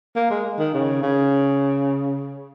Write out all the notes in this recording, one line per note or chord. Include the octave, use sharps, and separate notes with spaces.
A#3
G#3
D#3
C#3
C#3